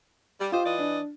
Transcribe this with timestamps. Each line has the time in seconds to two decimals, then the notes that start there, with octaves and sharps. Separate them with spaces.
0.40 G3
0.52 F4 G4 C5 D#5
0.65 E3 D5 D#5
0.79 D4